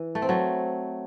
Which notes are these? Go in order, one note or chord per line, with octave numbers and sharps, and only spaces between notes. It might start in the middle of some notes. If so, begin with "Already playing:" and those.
Already playing: E3
A3
C4
F#3 A3